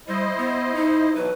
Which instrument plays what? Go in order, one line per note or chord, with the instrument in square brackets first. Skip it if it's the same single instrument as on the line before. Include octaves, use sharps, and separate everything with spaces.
[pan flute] G3 [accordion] E4 C5 D#5
[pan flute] B3
D#4
[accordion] B2 E3 F#3 [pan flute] B4